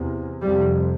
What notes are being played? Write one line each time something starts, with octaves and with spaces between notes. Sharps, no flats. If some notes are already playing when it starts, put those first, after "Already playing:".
Already playing: E2 C3
F2 C3 G3